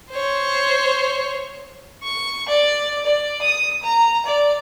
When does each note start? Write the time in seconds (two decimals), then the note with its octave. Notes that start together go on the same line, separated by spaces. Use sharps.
0.12 C5 C#5
2.03 C#6
2.49 D5
3.06 D5
3.42 D#6
3.83 A#5
4.26 D5